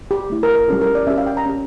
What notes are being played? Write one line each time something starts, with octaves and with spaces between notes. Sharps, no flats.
G4
A3 E4 G4
A#4
A#4
G3 C#4 F4 A4
A#4
D5
C#4 G4 E5
F5
G5
A#5
C#4 G4